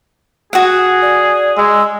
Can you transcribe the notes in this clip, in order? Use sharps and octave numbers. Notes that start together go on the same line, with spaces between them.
F#4 G#4 F#5
D5
G#3 E6